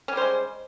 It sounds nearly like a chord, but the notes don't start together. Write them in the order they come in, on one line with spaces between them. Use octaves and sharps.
C#4 G3 C5 G#3